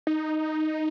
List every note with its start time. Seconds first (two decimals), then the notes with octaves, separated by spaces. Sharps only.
0.07 D#4